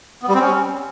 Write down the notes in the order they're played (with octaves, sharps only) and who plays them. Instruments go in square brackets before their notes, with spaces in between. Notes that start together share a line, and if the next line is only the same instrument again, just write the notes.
[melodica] B3
G3
C4
C#4